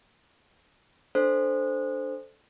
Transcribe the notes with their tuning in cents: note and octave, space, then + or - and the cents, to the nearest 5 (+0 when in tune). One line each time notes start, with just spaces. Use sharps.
D4 +0 A4 -5 C5 +0